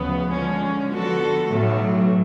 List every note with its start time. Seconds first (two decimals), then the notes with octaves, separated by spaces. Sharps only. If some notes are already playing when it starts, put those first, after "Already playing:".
Already playing: D2 C#3 F3 B3
0.29 D3 F3 G#3 C#4
0.89 D3 F3 B3 F#4 A4
1.49 B1 A2 F#3 A3